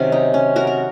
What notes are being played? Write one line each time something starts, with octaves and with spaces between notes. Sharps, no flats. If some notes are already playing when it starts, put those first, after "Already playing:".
Already playing: C3 D#3 F#3 C#4
D#4
C#4
F#4 A#4
A#4